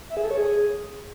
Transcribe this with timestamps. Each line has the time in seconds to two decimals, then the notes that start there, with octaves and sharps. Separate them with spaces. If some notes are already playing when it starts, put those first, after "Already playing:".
0.10 E5
0.17 G#4
0.24 A4
0.31 C#5
0.38 G#4